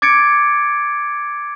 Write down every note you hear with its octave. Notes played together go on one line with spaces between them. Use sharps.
D6 G#6 A6 C#7 D7